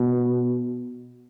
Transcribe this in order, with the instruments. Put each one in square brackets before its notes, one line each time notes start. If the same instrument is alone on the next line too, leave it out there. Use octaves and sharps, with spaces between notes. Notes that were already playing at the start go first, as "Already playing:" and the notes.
Already playing: [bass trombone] B2